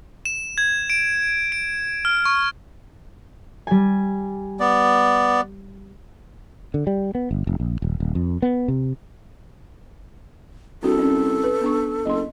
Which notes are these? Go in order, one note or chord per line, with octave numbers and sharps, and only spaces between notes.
E7
G#6
D7
D7
F6
C#6
G3 G#5
B3 D5
D3
G3
B3
G1
F1
A#1
D#1
D#1
F2
B3
C3
C2 D4 F#4 A4
C#4
B4
B3 D4 C#6
F#1 D#5 C6